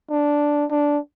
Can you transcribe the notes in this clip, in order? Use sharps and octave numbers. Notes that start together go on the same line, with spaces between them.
D4
D4